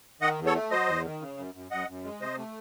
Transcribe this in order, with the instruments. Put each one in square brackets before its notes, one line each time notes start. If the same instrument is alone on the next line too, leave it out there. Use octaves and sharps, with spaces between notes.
[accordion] D#3 D#5 F#5
E2
A4 C#5
A3
F#3 C5 D#5
E2
D#3
C#3
F#2
F#2
F#2 D#5 F#5
F#2
G#3
C3 C5 D#5
A3